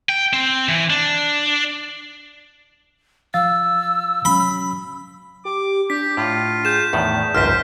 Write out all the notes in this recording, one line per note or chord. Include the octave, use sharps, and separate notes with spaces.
G5
C4
E3
D4
F3 F5 E6 A6
F#3 C#4 B5
G4 D6
D4 G4 B6
A2 F4
G#4 G6 E7
E2 A2 D#3 D5
G#1 C#2 F#2 C5 F6 F#6 B6